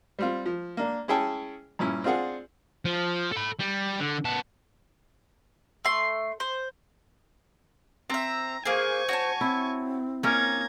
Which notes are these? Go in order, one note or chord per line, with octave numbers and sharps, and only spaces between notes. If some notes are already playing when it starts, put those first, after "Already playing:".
G3 C4 F4
F3
A#3 D4
C#4 E4 G#4 C#5 G5 A5
G2 A#2 C#4 E4
C4 D4 F4 G#4 F#5
F3
A4 B5
G3
D3
B3 A5
A3 C6
C5
C4 E5 A#5
A#3 G#4 C5 G#5 C#6
F#4 C#5 A5
C4 E4
A#3 C#4 D#4 A#4 A#5 G#6